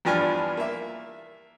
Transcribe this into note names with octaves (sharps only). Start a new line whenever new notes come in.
E2 G2 F3 D4 G#5 F6
A#3 E5